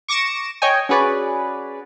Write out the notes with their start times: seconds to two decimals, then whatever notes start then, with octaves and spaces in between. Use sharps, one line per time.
0.08 C#6 D6 A#6 C#7 E7
0.62 C#5 D#5 G5 G#5
0.89 C#4 F#4 G#4 B4 C#5 D5